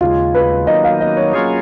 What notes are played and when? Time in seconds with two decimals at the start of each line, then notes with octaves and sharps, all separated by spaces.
0.01 D#2 C#3 G#3 F4
0.35 B4
0.67 D#3 F#3 A#3 D#4 D#5
0.84 F5
1.01 D#5
1.17 C#5
1.34 F#3 A#3 C#4 F4 G#4